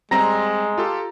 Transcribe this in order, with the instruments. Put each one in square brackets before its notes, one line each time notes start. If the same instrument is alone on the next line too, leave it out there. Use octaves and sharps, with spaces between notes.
[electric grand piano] G3 C4 [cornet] G#3 [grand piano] A#5 A#6
[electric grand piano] F4 G4 A4